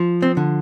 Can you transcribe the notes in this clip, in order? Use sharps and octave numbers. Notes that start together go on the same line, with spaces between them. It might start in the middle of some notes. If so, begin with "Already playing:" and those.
Already playing: F3
C4
D3